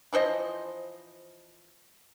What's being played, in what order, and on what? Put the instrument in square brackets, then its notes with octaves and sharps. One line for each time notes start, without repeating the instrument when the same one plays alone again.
[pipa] E3 F3 C5 D#5